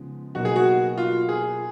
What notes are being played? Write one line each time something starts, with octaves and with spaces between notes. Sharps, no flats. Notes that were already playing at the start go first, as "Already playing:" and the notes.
Already playing: C#3 F3 G#3 B3 D#4
B2 F#3 A#3 D#4 F#4
G#4
F#4
F4
G#4